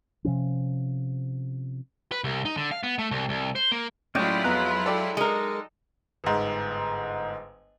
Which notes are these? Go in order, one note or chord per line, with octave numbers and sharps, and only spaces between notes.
C3 F3 C#4
B4
C2
D#4
D3
F5
B3
A3
C2
C2
C5
A#3
A2 F#3 G#3 C#4 E4 F4 D5 G5
F2 B3 A#5 F#6
A4 D5 G5
G#3 D#4 A#4
G1 G#2